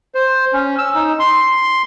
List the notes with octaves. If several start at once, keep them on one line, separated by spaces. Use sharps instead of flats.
C5
C#4
E6
D#4
C6